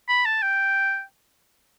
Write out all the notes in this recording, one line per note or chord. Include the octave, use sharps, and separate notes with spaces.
B5
A5
G5